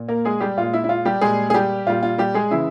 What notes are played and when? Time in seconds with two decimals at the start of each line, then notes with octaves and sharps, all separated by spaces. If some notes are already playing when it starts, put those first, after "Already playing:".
Already playing: A#2
0.08 A#3 A#4
0.25 G#3 G#4
0.40 G3 G4
0.57 A#2 G#3 F4
0.73 E4
0.84 E4
0.89 F4
1.05 G3 G4
1.21 A#2 G3 G#3 G#4
1.50 G#4
1.54 G3 G4
1.86 A#2 G3 F4
2.03 F4
2.18 G3 G4
2.34 G#3 G#4
2.51 C#3 E3 G#3 E4